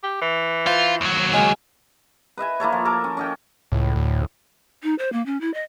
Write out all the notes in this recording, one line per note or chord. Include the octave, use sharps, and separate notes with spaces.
G4
E3
F4 C5
D#2 F#3
C#3 G#3 C#4
B4 D#5 E5 G#5
A#3 E4 A4 C#5
F3
A4 A#4 D6
C#4
C#4 D#5 G5
C#2 A2
D2
D#4
C5
A#3
C#4
E4
D#5